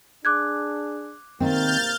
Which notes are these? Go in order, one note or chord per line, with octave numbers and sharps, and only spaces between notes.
D4 G#4 D6 F#6 G#6
G#2 C3 D#3 A#3 C4 F6 G6 A6